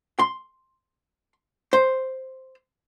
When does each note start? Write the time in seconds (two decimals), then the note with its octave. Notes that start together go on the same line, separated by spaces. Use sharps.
0.19 C6
1.73 C5